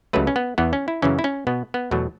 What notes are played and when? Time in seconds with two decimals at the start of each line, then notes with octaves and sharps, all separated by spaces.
0.13 C#2 C#3 F#3 A3 B4
0.27 C#4
0.36 B3
0.58 E2 E3 B3
0.73 C#4
0.88 E4
1.02 F#2 C#3 E3 C#4
1.19 E4
1.24 C#4
1.47 B2 B3
1.74 B3
1.91 E2 B2 F#3 A3